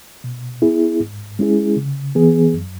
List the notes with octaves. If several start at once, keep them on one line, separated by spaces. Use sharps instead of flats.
B2
B3 E4 G#4
G#2
G#3 C#4 E4 G#4
C#3
E3 B3 G#4
F#2